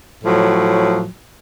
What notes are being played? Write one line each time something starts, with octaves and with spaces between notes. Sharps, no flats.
A2 F3 F#3